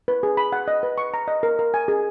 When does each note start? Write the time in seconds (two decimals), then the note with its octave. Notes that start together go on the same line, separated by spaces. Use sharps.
0.08 B4
0.23 G#4
0.37 B5
0.53 F#5
0.68 D#5
0.83 B4
0.98 C#6
1.14 A#5
1.28 D#5
1.43 A#4
1.59 A#4
1.74 G#5
1.88 G#4